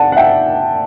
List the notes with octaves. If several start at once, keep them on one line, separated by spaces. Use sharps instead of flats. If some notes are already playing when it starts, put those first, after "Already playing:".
Already playing: D5 F#5 A5
F#5
E5 G5